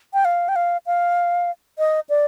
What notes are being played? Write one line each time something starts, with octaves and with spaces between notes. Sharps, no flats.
G5
F5
G5
F5
F5
D#5
D5